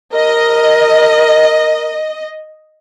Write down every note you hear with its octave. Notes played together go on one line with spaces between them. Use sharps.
A#4 D#5